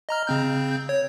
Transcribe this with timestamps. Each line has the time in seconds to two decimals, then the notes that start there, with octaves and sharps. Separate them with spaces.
0.09 D#5 A#5 F6
0.27 C#3 C4 G6
0.89 C#5